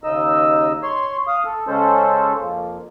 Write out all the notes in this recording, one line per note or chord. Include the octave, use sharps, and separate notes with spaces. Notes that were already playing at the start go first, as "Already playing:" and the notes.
D#2 C#3 D#4 D#5 E6
C#5 C6
F5 D#6
A4
C#3 G#3 C#4 A4 C5
F2 F3 A#3